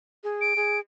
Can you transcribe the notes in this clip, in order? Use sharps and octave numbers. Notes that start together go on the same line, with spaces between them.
G#4
D7
G#4